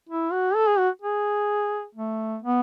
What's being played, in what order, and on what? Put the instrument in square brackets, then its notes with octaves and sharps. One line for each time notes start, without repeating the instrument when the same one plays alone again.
[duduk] E4
F#4
A4
G#4
F#4
G#4
A3
B3